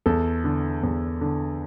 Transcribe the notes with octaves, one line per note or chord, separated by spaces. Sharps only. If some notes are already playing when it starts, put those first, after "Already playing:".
E2 A4
D3
E2
D3